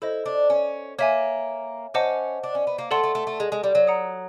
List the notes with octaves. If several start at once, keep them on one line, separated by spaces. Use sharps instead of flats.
E4 A4 C5 D#5
D4
C#4
A#3 C#5 E5 G#5
C#4 C5 D#5 F#5 A5 D6
D4
C#4
B3
A#3
A3 A4 D5 F#5 A5 C6
A3
A3
A3
G#3
G#3
G3
F#3
F#5 A#5 D#6